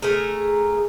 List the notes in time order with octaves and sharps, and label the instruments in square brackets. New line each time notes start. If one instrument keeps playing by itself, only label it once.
[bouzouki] A3 G#4 A#4